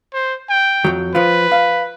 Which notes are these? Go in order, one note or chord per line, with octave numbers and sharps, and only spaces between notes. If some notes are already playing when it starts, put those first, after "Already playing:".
C5
G5
F2 F#3
F3 F4 B4
F5